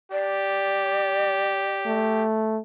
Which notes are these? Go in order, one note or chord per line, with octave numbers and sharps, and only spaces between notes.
G4 D5
A3